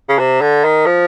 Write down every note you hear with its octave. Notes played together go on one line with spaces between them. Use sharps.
C#3
C3
D3
D#3
F3